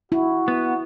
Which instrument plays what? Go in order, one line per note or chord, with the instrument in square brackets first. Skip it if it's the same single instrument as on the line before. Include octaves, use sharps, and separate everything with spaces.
[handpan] E4 [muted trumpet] F#4
[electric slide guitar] B3